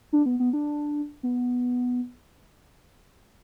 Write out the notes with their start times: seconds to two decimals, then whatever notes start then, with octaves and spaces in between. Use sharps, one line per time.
0.13 D4
0.26 B3
0.40 B3
0.53 D4
1.23 B3